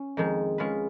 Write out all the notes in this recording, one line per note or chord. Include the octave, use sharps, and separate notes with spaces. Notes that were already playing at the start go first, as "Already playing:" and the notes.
Already playing: C#4
F2 D#3 G#3
G#3 C#4 F4 B4